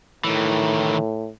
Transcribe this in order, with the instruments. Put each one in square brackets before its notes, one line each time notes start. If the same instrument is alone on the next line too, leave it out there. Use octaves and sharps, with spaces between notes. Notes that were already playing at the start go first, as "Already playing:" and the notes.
[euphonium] A2 [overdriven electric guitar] D#3 E3